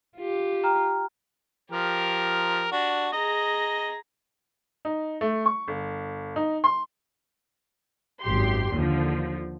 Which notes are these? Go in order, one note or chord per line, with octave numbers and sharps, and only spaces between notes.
F4 G4
G5 A#5 F6
F3 G4 A#4
D4 F#4
G#4 D#5 A#5
D#4
A3
C#6
G1
D#4
C6
G#1 F#2 G4 C6
D#2 D3 F3